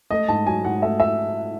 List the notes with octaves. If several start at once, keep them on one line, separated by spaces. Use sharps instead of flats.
A3 D#5
G#2 A5
F#3 G#5
G#2 F#5
A3 E5
E5